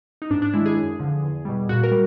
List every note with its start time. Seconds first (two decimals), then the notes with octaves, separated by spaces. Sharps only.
0.22 D#4
0.30 G#2 D4
0.42 D4
0.53 D#3 G#3 E4
0.66 G#4
0.76 F#2
0.99 D3 F3
1.23 E2
1.45 B2 G3
1.69 A#2 F#4
1.83 A#4
1.91 G3